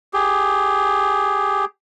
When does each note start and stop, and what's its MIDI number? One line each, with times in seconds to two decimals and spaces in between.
0.13 1.65 67
0.13 1.65 68